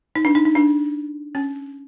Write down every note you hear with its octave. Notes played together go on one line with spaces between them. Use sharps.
D#4
D4
D#4
D#4
D4
C#4